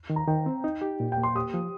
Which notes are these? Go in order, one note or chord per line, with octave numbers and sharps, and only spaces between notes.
D#3
A#5
D#3 G5
C4
D#4
G4
A#2
G5
A#3
C6
G4 D#6
F3